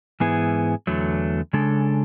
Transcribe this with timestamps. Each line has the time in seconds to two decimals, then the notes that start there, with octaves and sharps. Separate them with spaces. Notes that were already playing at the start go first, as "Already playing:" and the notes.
0.20 G#2 E3 B3 E4 G#4
0.87 E2 D3 F#3 A3
1.53 C#3 G#3 D4 A4